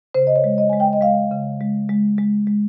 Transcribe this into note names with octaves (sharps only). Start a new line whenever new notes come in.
C#3 C5
D#5
C#5
G#3
D#5
G#3 G#5
G5
D#5
G#3 F5
C#3
G#3
G#3
G#3
G#3